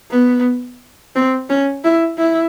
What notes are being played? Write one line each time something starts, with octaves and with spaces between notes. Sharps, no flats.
B3
C4
C#4
E4
E4